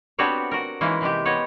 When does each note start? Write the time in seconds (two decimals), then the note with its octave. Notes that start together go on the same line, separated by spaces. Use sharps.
0.19 B3 C4 D4 F#4 G4 C#5
0.51 F#4 A#4
0.81 E3 G#3 A#3 C#4 D#4
1.01 C3 G#3 G4
1.25 B3 C#5 D#5